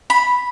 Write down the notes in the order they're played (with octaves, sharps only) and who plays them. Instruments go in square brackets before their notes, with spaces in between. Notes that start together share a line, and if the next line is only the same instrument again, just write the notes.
[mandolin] B5